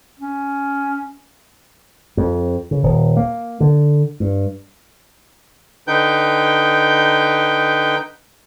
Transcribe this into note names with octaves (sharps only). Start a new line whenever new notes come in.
C#4
F2
C#3
D#1
A#3
D3
G2
D3 D#4 B4 G5 G6